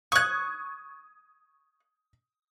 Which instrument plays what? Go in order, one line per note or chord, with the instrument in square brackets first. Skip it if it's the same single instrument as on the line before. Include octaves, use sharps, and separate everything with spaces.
[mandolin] C#6 F#6 [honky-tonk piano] D#6 G#6